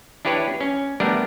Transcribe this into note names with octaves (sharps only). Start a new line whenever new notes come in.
D4 E4 G4 B4 C#5
C#4
G3 A3 B3 D4 A#4 D5